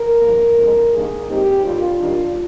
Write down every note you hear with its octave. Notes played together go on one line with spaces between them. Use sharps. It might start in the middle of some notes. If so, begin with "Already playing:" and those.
Already playing: A#4
G2 F3 A#3
F2 D3 G#3
G2 D#3 A#3 G#4
A#2 G#3 C4 D#4 G4
D#2 D3 G3 F4
D#2 D#3 G3 D4